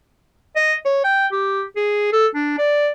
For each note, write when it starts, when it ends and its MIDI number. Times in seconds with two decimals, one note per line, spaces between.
0.56 0.75 75
0.85 1.00 73
1.04 1.27 79
1.32 1.64 67
1.76 2.08 68
2.12 2.27 69
2.35 2.57 62
2.58 2.90 74